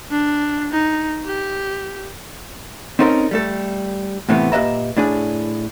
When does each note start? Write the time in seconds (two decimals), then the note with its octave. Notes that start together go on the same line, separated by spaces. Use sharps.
0.11 D4
0.72 D#4
1.26 G4
2.99 C4 C#4 D#4 A4 A#4
3.31 G3 A3 A4
4.29 A2 C3 E3 A3 B3
4.52 A#2 G4 B4 D#5 E5 A#5
4.97 A2 D4 G#4